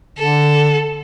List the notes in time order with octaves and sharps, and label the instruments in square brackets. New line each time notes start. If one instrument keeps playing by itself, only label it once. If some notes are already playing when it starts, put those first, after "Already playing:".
[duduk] D3 [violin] A4